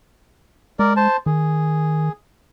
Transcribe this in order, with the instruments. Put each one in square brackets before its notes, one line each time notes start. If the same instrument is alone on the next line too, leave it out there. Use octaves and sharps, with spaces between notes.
[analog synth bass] G#3 [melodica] A#4 D5
[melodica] C5 A5
[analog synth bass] D#3 [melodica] G#4